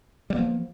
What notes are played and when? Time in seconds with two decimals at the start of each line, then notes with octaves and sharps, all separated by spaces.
0.30 G3
0.33 B3
0.36 A#3
0.38 F3